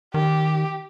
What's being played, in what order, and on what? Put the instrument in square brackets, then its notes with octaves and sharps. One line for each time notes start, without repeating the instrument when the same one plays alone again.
[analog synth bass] D#3 [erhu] G4